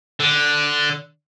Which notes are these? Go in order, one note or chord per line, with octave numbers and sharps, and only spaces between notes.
D3